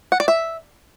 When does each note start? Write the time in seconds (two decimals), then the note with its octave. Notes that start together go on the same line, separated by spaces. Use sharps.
0.12 F#5
0.20 D5
0.28 E5